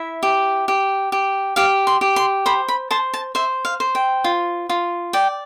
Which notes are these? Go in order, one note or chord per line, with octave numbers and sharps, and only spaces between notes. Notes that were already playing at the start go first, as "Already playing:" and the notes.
Already playing: E4 E5
G4
G4
G4
G4 F5
C6
G4
C6
C5 B5
B5
C5 A5
A5
C5 E5
F5
C5
G5
F4
F4
D5 G5